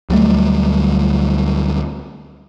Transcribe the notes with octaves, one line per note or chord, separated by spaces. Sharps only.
D2 F#3 G3 A3